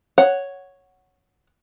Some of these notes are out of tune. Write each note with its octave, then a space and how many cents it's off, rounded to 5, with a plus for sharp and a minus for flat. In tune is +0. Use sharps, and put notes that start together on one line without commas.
C#5 +0 F#5 +0